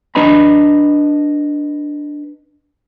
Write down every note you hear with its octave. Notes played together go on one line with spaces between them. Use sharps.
D4 B4 D#5 A#5 B5